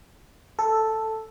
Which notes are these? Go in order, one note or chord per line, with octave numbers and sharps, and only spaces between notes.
A4